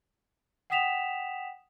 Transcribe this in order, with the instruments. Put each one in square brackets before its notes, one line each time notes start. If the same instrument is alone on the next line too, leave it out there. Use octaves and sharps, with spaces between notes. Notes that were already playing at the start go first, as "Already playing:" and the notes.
[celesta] F#5 G5 D#6 B6 E7 F7